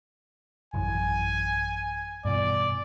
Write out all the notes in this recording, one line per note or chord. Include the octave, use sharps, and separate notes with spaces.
A1 F#2 E3 G#5
G2 B2 E3 D5